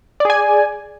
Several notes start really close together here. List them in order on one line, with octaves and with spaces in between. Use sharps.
D5 G#4 G#5